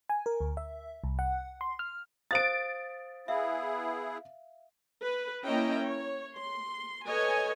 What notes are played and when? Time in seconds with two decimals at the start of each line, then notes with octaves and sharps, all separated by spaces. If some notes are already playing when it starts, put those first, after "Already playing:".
0.09 G#5
0.26 A#4
0.41 D2
0.57 E5
1.04 C2
1.19 F#5
1.61 C6
1.79 F6
2.31 C5 F5 D#6 A6 D7
3.28 B3 E4 G#4 E5 F5
5.02 B4
5.45 A#3 C#4 E4 D#5 G5 A#5
5.82 C#5
6.35 C6
7.06 A4 B4 C#5 D#5 G#5